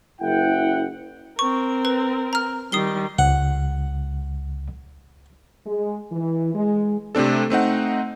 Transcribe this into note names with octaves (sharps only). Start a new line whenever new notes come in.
F#1 E4 F#5 G5
C4 A#4 C#6
B4
A#5 F6
D#3 G3 D#6 C7 G7
C#2 F#5
G#3
E3
G#3
C3 A3 C4 D4 A4
A3 C4 D#4 F#5